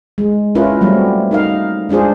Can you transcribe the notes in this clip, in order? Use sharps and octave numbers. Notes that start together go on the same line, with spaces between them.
G#3
C#4 E4 F4 A#4 B4
F#3 G3 A3 B3 C4
D#4 A#4 F5
G#3 D4 F4 G#4 C5